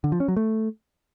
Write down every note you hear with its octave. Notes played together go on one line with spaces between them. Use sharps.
D3
F3
C#4
F#3
A3